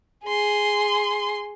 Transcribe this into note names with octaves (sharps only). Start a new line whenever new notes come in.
G#4 C6